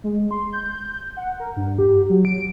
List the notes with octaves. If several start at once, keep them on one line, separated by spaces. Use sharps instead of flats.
G#3
C6
G6
F#5
A#4
G2
G4
F#3
D7